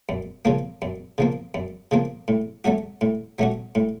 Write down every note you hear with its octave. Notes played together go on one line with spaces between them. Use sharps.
F#2
C#3 F3 A#3
F#2
C#3 F3 A#3
F#2
C#3 F3 A#3
A2
F#3 A3 C#4 F#4
A2
F#3 A3 C#4 F#4
A2